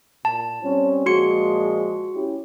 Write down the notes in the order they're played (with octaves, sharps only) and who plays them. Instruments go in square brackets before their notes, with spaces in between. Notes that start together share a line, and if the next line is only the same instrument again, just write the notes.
[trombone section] A#2 [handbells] A5
[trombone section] G3 C4 C#4
[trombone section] A#2 F3 G#3 [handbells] F#4 C6 C#7
[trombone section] C#4 E4 G4